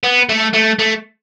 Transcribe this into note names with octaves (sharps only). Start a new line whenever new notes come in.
B3
A3
A3
A3